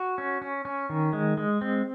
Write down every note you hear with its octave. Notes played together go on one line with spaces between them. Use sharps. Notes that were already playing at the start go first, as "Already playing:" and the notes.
Already playing: F#4
C#4
C#4
C#4
D#3
G#3
G#3
C4